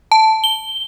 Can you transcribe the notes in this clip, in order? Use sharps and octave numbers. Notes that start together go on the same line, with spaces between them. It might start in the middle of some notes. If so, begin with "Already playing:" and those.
A5
G7